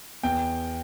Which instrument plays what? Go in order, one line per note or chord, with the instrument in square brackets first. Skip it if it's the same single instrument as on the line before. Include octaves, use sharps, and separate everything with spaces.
[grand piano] E2 G5